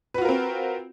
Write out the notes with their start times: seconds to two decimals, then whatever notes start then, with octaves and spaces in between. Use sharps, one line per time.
0.14 B4
0.18 F#4
0.21 F4
0.25 A#4
0.29 C4